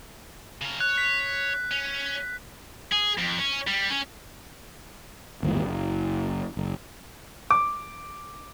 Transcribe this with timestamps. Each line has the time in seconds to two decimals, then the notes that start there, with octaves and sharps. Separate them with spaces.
0.62 C#3 A#4
0.80 C#5 F#6
0.98 B6
1.71 C#4
2.92 G#4
3.18 F2
3.39 C#4
3.67 G3
3.90 C#4
5.43 G1 D#2 G#2 E3
5.62 F#1
6.57 F#1
7.51 D6